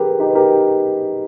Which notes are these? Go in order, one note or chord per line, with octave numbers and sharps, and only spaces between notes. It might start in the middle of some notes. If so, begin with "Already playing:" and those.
Already playing: G4 G#4 A#4 B4
D#4 G4
B4
G4 A#4